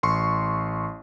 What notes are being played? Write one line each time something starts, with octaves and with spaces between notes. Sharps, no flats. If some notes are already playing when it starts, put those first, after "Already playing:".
A1 C6 C#6